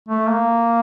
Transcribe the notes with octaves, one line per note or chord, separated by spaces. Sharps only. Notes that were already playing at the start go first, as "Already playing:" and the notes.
A3
A#3